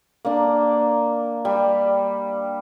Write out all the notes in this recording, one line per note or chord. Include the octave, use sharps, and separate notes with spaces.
A#3 D4
G3